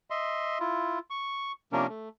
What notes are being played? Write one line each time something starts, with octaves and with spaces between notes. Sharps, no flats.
D#5 E5 C6
E4 F4
C#6
C3 F3 A#3 C#4 D4 A#4
A3